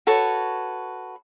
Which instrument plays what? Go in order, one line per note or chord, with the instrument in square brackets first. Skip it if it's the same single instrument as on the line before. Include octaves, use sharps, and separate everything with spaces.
[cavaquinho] F#4 A4 B4 C#5